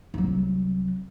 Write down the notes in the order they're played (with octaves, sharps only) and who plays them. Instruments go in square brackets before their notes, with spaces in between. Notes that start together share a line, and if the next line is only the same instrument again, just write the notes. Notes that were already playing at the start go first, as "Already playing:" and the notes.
[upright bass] C2 F#3